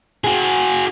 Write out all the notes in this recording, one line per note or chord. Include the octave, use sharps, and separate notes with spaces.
F#4 G#4